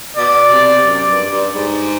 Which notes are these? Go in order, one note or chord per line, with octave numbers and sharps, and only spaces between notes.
B2 D5
C3
F#2 D5
G2
G2
G#2